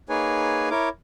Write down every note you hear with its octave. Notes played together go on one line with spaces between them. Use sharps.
A#3 D#4 G#4 B4 C#5 G#5
E4 A#4 C#5 D6